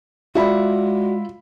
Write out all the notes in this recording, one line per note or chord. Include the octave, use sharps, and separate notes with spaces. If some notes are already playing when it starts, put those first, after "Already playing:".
G#3 F4 F#4 D5 E5 B5